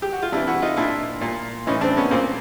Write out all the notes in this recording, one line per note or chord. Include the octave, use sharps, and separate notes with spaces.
G4
F#4
F4
C3 E3 D4 E4
E4 F#4
D#4 F4
A#2 D4 E4
A#2
A2 E3 C#4 D#4
C4 D4
B3 C#4
A#2 A#3 C4